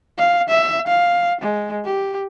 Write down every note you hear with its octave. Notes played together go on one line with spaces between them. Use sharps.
F5
E5
F5
G#3
G4